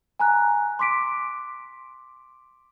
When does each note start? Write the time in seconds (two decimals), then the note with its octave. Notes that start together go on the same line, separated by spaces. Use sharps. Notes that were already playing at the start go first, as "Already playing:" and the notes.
0.19 G#5 A#5 F#6
0.79 C6 D6 B6 D7